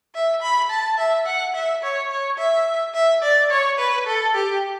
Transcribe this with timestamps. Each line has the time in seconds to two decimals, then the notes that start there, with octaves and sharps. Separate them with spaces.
0.15 E5
0.42 B5
0.70 A5
0.98 E5
1.26 F#5
1.55 E5
1.83 C#5
2.10 C#5
2.38 E5
2.94 E5
3.23 D5
3.51 C#5
3.79 B4
4.07 A4
4.35 G4